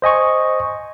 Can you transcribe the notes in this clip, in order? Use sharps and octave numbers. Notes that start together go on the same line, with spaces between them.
C5 D#5 G#5 C#6